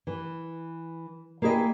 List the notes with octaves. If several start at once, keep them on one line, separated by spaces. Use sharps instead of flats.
E3
A#3 E4 G#4 B4 D#5 G5